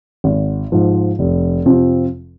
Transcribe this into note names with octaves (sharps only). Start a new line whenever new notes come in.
G#1
G#2 F3
F1
F2 C3 F3 C4